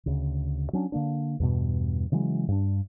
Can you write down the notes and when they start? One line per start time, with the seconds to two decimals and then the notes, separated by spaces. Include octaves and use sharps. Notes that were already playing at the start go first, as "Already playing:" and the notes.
0.06 D2 C#3
0.73 F#3 C#4 D4
0.92 D3 A#3 D4
1.40 E2 G2 B2
2.12 C#3 E3 F#3 G#3
2.48 G2 D4